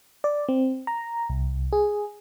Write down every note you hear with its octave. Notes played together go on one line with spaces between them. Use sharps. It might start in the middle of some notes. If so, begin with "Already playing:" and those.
D5
C4
A#5
C2
G#4